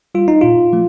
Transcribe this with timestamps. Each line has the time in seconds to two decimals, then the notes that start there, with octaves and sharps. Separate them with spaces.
0.15 G3 F4
0.28 D#4
0.41 A#2 F4
0.73 F3 A3